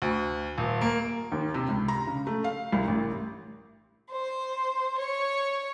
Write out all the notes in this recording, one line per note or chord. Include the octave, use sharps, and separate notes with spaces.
D2
D#1
A#3
D#2
C3
C#2
A#5
C#3
A3
F5
C2
A1
C5
C#5